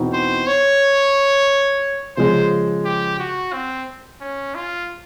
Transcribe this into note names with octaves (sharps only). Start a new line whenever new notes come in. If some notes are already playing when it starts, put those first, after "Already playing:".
Already playing: E2 B2 C4 D#4
C5
C#5
C#3 F3 G#3 C5
G4
F#4
C4
C#4
F4